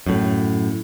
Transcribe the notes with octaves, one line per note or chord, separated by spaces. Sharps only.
F#2 A2